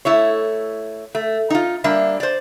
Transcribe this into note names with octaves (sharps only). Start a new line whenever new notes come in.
A3 E4 C#5
A3
D#4 F4
G3 A#3 D4 E5
C5 D5